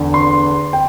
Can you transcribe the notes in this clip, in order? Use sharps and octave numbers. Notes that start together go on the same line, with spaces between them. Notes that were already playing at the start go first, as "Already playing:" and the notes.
Already playing: E2 D3
C6
G5